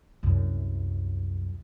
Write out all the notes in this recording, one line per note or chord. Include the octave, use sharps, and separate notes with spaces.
C2 F#2